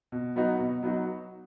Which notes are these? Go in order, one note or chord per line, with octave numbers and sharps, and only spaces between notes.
B2
F#3 B3 D#4 F#4
B2
F#3 B3 D#4 F#4